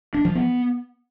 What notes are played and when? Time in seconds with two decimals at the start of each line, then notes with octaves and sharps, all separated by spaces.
0.14 D4
0.25 F3
0.35 B3